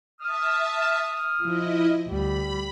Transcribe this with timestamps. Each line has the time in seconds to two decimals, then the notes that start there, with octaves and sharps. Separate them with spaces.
0.21 E5 A5 D#6 F6
1.42 F3 E4 D#5
2.08 D2 G3 B5